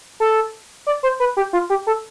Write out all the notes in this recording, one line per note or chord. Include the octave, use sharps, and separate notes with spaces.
A4
D5
C5
B4
G4
F4
G4
A4